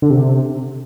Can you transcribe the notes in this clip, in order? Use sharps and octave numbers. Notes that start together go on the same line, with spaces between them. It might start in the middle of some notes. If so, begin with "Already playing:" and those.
D3
C3